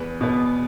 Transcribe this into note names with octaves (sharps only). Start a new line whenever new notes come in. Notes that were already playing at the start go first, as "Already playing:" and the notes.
Already playing: E2 B4
B2 B3